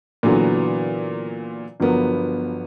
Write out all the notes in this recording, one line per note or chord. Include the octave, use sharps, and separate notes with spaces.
A#2 D3 E3 F#3 B3
G1 F3 F#3 B3 A#4